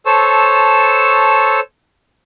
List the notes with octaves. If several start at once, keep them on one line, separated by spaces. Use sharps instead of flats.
A4 C5 C#5 A5 C#6 E6